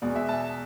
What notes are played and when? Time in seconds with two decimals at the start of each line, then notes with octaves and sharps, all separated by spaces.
0.02 E2 B2 G#3 D5
0.15 E5
0.29 A5